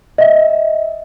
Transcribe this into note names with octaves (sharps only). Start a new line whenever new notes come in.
D#5 E5